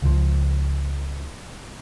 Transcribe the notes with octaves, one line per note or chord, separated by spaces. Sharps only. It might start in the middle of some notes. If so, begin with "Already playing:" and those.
C#2 F3